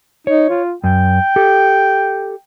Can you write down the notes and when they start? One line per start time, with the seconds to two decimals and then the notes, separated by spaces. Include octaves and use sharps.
0.27 D#4 C#5
0.50 F4
0.84 F#2 G5
1.36 G4 A4